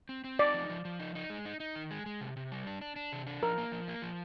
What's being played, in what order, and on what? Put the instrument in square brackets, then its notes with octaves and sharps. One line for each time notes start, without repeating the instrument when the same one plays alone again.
[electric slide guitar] C4
C4
[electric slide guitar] D#4 [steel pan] D5
[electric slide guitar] F3
F3
F3
D#4
D#4
G#3
D#4
D#4
D#3
G#3
G#3
C3
C3
G3
D4
D4
D4
C3
D4
[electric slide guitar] F3 [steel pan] A#4
[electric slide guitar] A#3
F3
A#3
F3